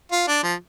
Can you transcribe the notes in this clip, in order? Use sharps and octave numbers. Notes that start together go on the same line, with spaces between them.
F4
D4
F3